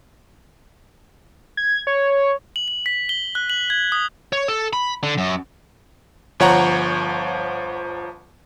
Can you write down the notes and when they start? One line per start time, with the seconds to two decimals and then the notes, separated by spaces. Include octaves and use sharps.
1.57 G#6
1.87 C#5
2.56 F#7
2.68 F#7
2.86 B6
3.09 G7
3.35 F#6
3.50 F#7
3.70 G#6
3.92 D#6
4.33 C#5
4.48 A4
4.73 B5
5.03 D3
5.18 F#2
6.40 G1 F3 C#5 F#5 A#5